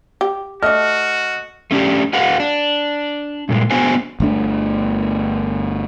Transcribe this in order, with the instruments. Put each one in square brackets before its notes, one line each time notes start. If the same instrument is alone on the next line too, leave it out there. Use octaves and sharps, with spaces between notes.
[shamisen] G4
[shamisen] A3 D4 [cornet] F#4 [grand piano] D#5 [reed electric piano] F6
[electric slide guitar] A3 C#4 D4 G4
F#4 G#4 B4 F5 F#5
D4
G2 A#2 G#3
B3 D4 F#4 G#4 C5 G#5
[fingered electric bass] G1 A3 D4